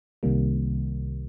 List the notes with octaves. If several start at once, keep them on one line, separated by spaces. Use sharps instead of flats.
C2 C3 D#3 G3 A#3